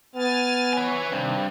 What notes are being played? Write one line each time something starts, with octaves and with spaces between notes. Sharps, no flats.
B3 G#5 F6 A6
B4 C#5 G#5
G2 C3 D#3 C4